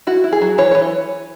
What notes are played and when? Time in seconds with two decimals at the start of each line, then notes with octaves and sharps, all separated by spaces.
0.07 E4 F#4
0.24 E4
0.33 G#4
0.41 F#3
0.58 E3 C#5
0.71 E3 C#5